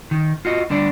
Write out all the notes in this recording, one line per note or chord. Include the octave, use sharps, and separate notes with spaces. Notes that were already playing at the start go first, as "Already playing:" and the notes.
D#3
F4 F#4 D#5
D2 D3 G3 D4 D5